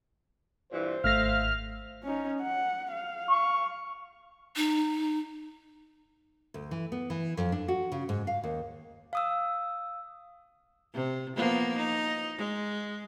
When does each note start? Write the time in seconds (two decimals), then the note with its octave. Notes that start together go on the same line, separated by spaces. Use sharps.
0.72 G2 A#2 E3 C5
1.04 G#1 A3 E5 F5 F6 A#6
2.04 C#4 D#4
2.42 F#5
2.93 F5
3.29 C#6
4.56 D#4
6.54 D2
6.71 E3
6.92 B3
7.10 E3
7.37 F2
7.52 D4
7.68 F#4
7.92 C#3
8.09 G#2
8.27 F5
8.44 D#2
9.13 F5 D#6 E6
10.94 C3
11.36 F3 A#3 B3
11.77 D#4
12.37 G#3